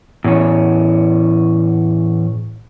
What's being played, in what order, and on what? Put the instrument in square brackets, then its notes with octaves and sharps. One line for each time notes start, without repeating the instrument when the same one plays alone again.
[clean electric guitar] E2 C#4 [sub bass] A2